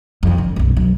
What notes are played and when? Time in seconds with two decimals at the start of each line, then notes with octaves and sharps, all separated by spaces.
0.23 F2 D#3
0.38 D3
0.56 B1 F#2
0.77 F#3